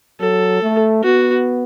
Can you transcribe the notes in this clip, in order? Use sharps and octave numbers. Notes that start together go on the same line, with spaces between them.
F#3 A4
A3
B3 F#4